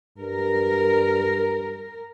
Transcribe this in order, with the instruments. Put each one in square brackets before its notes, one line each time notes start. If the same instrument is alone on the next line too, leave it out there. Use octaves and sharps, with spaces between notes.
[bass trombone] G2 [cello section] A#4